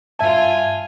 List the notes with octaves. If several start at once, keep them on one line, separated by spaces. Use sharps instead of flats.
G2 F4 E5 G#5 A5